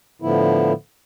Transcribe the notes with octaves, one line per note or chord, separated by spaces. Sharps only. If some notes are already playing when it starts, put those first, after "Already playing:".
A2 D3 F3 B3 E4